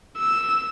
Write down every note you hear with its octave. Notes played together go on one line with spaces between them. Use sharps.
E6